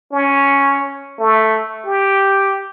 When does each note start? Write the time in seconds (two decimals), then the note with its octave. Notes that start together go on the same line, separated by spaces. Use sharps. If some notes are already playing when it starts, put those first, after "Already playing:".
0.12 C#4
1.19 A3
1.86 G4